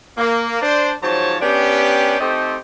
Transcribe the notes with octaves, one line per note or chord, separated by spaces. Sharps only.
A#3
D4 C5
G#2 F3 F#3 C5 C#5 A5
B3 C#4 D4 G4
A3 C4 D#4 G4 A4 C5